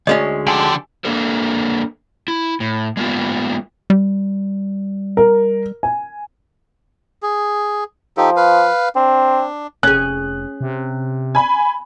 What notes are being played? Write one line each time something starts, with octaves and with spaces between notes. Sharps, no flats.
D2 G#3 C#4 D5 D#5
D3 F3 G4 A4 G#5 C6
A#3 D4 A4 A#4
E4
A2
G#3 A#3 B3 F4
G3
A#4
G#5
G#4
F3 D#4 G4 A4
B4 F5
C4 D4
F1 C#4 G#4 F#6
C3
G#5 B5